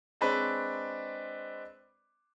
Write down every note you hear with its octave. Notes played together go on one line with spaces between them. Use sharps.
G#3 C4 D4 B4 C#5